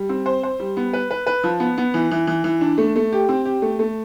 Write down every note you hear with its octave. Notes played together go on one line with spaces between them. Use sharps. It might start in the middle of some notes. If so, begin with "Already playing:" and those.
Already playing: G3
C4
C5
C5
G3
B3
B4
B4
B4
F3
B3
B3
E3
E3
E3
E3
D4
A3
A3
G4
C4
G4
A3
A3